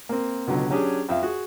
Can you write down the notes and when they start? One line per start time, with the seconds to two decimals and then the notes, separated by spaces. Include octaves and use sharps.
0.09 A#3 C4
0.47 C#2 B2 D3 F#3
0.70 F#3 C#4 D4 G4 G#4
1.09 F2 E5 F5
1.23 F#4 G#4